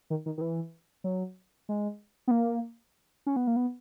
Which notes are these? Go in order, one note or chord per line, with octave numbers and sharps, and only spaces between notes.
D#3
D#3
D#3
E3
F#3
G#3
B3
A#3
C#4
B3
A#3
B3